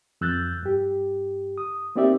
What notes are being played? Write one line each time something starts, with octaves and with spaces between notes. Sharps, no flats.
F2 E6 F#6 G6 A6
G2 G4
D#6
A#3 C4 D#4 G4 D5 E5